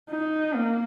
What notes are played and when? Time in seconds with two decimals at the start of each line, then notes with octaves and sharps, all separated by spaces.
0.10 D#4
0.55 A#3